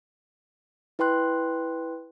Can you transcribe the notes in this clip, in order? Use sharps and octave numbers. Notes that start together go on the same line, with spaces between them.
E4 B4 G5 C6 F#6